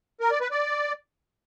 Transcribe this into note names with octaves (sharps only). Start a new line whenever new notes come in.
A#4
D5
B4
D5